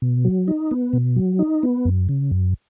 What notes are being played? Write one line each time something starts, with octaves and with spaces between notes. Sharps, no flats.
B2
F#3
D#4
B3
B2
F#3
D#4
B3
F#2
C#3
F#2